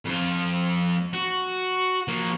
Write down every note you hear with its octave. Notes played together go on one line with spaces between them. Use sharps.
F2 F3
F#4
F3 A#3